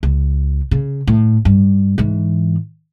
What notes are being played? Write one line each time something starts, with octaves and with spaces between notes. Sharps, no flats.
C#2
C#3
A2
G2
G#2 E3